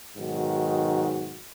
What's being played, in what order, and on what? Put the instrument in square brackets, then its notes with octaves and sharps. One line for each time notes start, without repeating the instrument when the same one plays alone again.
[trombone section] B1 G#2 D#3 F#4